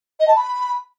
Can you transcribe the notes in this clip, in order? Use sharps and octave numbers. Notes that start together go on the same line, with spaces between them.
D#5
A5
B5